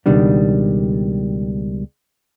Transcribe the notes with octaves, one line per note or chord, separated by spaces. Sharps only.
C#2 B2 D#3 G3 D4